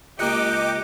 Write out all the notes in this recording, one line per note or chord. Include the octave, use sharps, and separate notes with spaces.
C#2 A#3 G4 D#5 C6 D6 F#6 C#7